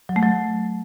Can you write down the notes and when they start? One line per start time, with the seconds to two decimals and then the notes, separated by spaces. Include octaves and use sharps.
0.09 F#3
0.16 A3
0.23 F#3